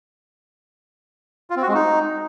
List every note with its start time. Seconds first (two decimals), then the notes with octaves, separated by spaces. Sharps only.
1.50 F4
1.56 C4
1.62 F#4
1.68 G#3
1.74 D#4